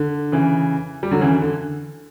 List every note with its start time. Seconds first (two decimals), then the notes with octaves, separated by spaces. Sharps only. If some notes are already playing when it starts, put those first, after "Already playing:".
Already playing: D3
0.32 C#3 E3
1.03 G3
1.11 D3 F#3
1.21 C#3 E3
1.42 D3